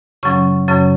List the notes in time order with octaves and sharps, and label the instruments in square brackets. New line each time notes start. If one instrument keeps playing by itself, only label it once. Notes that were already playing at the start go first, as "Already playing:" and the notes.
[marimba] F#2 C#3 F#3 C#4 C#6
F#2 C#3 F#3 C#4